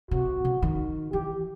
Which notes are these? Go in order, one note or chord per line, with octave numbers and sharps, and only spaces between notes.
C3 F#4
C#3
D#3
E3 G4